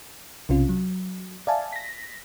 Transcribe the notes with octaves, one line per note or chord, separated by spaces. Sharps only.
B1 C3 C#4 F4
F#3
D5 E5 F5 G#5 A5
A#6 B6